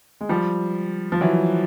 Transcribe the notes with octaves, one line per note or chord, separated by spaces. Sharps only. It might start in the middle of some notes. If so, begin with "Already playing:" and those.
G#3
F3 G3
F3
E3 F#3